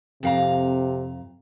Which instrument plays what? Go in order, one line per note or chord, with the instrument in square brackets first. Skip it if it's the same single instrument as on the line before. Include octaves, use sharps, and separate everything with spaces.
[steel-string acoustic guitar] F2 F5 A#5 [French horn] C3